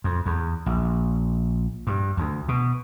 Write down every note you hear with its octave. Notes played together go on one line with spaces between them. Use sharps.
F2
E2
A#1
G2
D2
B2